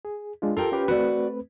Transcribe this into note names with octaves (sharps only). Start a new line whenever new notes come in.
G#4
G#3 D4 F4
F4 G4 A4 A#4 G5
C#4 G4 B4
A3 C4 F#4 B4 D5